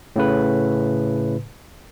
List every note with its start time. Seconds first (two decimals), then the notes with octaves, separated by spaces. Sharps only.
0.16 A2 C#3 B4